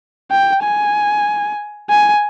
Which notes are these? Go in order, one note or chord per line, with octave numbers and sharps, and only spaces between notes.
G5
G#5
G#5